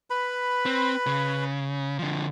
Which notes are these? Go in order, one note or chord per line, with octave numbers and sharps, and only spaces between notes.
B4 B5
C4
C#3
D3 F3